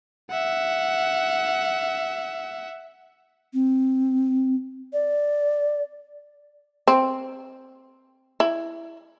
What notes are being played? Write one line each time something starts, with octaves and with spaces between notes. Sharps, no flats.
E5 F#5
C4
D5
C4
E4